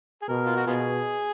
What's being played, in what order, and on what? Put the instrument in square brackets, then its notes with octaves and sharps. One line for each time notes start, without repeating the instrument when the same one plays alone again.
[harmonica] G#4
[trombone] B2 [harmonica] A#4
[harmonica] F4
F#4
[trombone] B2 [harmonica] B3 F4 G#4